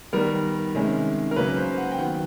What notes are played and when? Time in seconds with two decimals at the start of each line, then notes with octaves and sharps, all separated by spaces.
0.13 D#3 G3 B3 A#4
0.75 C3 D#3 G#3 C#4
1.31 A#4
1.36 C#3 F#3 A#3 C#4 B4
1.57 C5
1.77 F#5
1.91 G5
1.98 D#3 F#3 B3 F#5